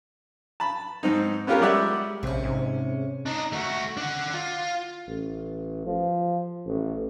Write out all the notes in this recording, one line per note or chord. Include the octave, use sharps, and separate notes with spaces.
A5 B5
G#2 C4 D#4
B3 C#4 F4 G4 A#4 B4
G3 G#3 G4 D5 E5 F#5
A#1 C3 C#4
G#2
D4 D#4
A3 F#4
D4 F#5
F4
A1
F3
A1